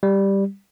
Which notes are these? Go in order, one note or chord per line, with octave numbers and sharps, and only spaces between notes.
G3